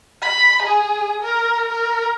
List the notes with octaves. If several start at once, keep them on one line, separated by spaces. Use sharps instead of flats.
B5
G#4
A#4
A#4